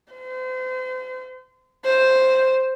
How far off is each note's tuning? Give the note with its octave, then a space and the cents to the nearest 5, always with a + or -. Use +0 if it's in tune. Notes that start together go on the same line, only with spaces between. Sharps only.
C5 -35
C5 +0